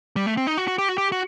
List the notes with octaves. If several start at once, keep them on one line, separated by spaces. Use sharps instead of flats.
G3
A3
C4
D#4
F#4
F#4
G4
F#4
G4
F#4